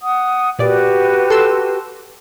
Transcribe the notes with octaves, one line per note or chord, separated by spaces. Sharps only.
F#5 D#6
A#2 F#4 G4 B4 D5
A4 C6 E6